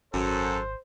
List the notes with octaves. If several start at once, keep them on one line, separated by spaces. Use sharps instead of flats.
G#1 F#2 A4 C5